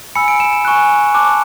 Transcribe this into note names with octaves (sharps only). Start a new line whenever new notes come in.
G#5 B5 E6 C#7
D7
E7
E7
G#5 C#6 F#6
A5 D6 F#6